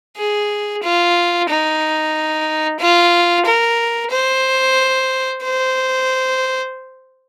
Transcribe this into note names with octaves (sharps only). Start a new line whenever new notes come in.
G#4
F4
D#4
F4
A#4
C5
C5